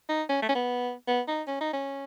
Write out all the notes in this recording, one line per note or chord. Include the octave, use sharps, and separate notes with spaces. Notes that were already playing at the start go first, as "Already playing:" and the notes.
D#4
C#4
A3
C#4
B3
B3
D#4
C#4
D#4
C#4